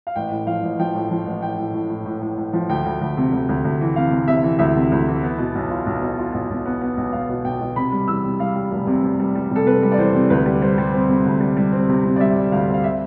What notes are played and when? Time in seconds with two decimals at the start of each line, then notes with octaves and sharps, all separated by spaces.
0.07 F5
0.16 A1 G5
0.31 A2
0.47 F3 F5
0.63 A1
0.79 F3 G5
0.95 A2
1.11 F3
1.26 A1
1.42 A2 G5
1.59 A2
1.74 A2
1.90 A2
2.06 A2
2.22 A2
2.38 A2
2.53 F3
2.69 D2 G5
2.85 D2
3.01 D2
3.17 C3
3.32 D2
3.49 D2
3.64 D2
3.81 E3
3.96 C3 F5
4.11 C3
4.27 C3 E5
4.43 E3
4.59 D2 E5
4.75 C3
4.92 D2
5.08 E3
5.23 B3
5.38 B2
5.55 B1
5.71 F4
5.86 B1
6.02 B2
6.18 F4
6.34 B1
6.50 B1
6.65 B3
6.82 B3
6.97 B1
7.12 B1 F5
7.29 B2
7.45 B1 G5
7.61 B2
7.76 C3 B5
7.92 G3
8.08 E2 E6
8.24 C3
8.39 G3 F5
8.55 G3
8.71 F1
8.87 C3
9.04 C3
9.19 G3
9.35 G3
9.51 C3 A4
9.66 C3 B4
9.82 G3
9.92 D5
9.98 E2 C5
10.14 C3
10.30 D2 B4
10.46 G3
10.62 G3 C5
10.78 G3
10.94 C4
11.09 C3
11.26 D2
11.40 G3
11.56 G3
11.73 C4
11.89 C3
12.04 C3
12.16 D5
12.20 G3 E5
12.36 G3
12.52 D2 F5
12.68 C4
12.74 F5
12.84 E5